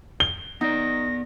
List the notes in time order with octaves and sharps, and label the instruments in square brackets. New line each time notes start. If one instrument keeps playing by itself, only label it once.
[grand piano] G7
[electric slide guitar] B3 D5 [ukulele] D#4 [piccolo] A#6